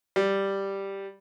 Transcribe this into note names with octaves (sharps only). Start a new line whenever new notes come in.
G3